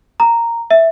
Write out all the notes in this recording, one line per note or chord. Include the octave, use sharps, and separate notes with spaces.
A#5
E5